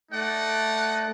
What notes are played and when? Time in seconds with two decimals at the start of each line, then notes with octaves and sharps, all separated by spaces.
0.12 A3 D#4 D5 F#5